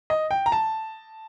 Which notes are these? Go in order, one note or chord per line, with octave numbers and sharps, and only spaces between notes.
D#5
G5
A#5
A5